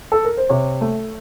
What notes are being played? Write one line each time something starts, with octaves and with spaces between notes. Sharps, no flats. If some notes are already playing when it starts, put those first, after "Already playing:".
A4
A#4
C5
C3 C#5
A3